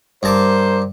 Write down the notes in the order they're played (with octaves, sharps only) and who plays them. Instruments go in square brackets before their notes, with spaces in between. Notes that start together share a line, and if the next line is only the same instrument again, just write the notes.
[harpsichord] G2 A5 D6 [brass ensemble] A#4 C5